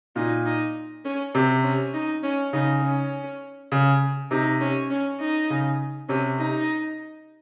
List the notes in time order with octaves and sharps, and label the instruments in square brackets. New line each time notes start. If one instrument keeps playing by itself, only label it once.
[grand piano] A#2 [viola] D#4
[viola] D#4
C#4
[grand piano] C3 [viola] C4
[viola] C#4
D#4
C#4
[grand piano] C#3 [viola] D#4
[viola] C#4
[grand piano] C#3
[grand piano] C3 [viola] D#4
[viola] C#4
C#4
D#4
[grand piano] C#3
[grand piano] C3 [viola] C#4
[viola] D#4